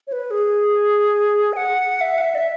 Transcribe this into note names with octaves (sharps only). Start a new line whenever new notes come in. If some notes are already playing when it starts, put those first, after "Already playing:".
C#5
B4
G#4
G#5
F#5
E5
F#5
E5
D5
E5